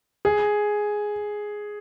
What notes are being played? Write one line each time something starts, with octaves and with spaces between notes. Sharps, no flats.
G#4